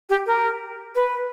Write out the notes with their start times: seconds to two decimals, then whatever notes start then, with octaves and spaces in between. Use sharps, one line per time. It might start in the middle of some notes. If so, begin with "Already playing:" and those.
0.09 G4
0.26 A#4
0.95 B4